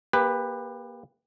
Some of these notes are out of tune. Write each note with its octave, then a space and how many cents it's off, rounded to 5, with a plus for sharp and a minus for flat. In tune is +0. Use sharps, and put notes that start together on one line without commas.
A#3 +25 G4 +30 B4 +0